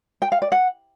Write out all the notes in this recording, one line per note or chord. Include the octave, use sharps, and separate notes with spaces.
G5
F5
D5
F#5